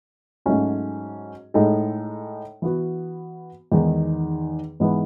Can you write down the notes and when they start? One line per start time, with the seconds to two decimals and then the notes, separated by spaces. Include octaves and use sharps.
0.46 G#2 F#3 A3 C#4 F#4
1.54 A2 G#3 D#4 A4
2.62 E3 B3 F#4
3.72 E2 D#3 G#3 D#4
4.80 G#2 E3 G#3 B3